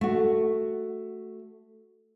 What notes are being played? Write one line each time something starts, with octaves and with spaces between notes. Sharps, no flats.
A3 F#4